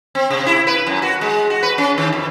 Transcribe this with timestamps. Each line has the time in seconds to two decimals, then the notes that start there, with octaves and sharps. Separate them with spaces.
0.15 C4
0.30 C3
0.46 E4
0.67 B4
0.86 F#2
1.02 F#4
1.21 G#3
1.50 F#4
1.63 B4
1.78 C#4
1.98 D#3
2.13 F2